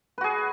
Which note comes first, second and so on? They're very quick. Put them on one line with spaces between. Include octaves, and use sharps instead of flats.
B4 F#4 G#4